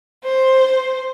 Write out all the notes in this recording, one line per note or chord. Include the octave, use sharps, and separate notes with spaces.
C5